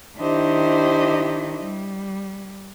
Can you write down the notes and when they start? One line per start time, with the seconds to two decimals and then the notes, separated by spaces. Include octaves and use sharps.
0.18 D#3 D4 E4 G4 C5 D#5
1.63 G3